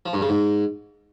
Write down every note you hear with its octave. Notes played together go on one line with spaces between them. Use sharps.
F3
G2
C#3
G#2